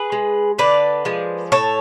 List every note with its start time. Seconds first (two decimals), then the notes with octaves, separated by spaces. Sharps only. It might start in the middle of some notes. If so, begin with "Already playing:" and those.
Already playing: G#4 B4
0.12 G#3
0.59 D3 B4 D5
1.05 F3 G#3
1.52 A2 A4 C#5